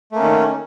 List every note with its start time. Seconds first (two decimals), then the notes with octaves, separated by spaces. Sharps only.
0.12 A3
0.15 A#3
0.19 C#4
0.22 D#3